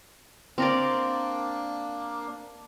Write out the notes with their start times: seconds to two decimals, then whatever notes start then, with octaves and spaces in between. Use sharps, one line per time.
0.58 A#3 C4 D4 A#4 D5